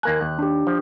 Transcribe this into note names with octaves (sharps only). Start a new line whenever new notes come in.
D#2 A#3 G#5 F#6
D#2
D4 G4
F3